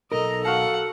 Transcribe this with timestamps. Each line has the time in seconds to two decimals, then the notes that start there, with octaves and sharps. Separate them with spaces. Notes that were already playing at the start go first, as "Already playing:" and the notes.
0.12 B1 D#4 A4 A#4 D#5 A#5
0.45 F#4 F5 F#5 A5